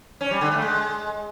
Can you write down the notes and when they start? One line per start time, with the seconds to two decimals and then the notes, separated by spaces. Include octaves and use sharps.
0.21 C#4
0.31 G3
0.41 D3
0.52 A3
0.62 G#3